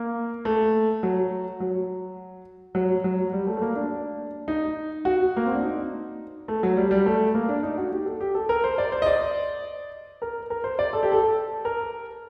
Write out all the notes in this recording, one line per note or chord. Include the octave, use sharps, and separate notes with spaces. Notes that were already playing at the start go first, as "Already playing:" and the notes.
Already playing: A#3
A3
F#3
F#3
F#3
F#3
G3
A3
A3
A#3
D4
D#4
F#4
A#3
C4
D4
D#4
A3
F#3
G3
G3
A3
A#3
D4
D#4
F#4
G4
A4
G4
A4
A#4
C5
D5
C5
D#5
D5
A#4
A#4
C5
D5
A4
G4
A4
A#4